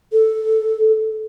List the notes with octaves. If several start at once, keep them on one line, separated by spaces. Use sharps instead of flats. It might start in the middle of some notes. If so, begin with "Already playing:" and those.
A4